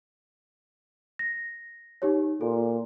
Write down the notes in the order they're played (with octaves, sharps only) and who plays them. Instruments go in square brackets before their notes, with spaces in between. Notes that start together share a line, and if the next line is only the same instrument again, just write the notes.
[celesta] A#6
D#4 G4 C#5
[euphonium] A#2 [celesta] A4